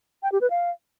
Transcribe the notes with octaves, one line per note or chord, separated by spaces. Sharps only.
G5
G4
B4
F5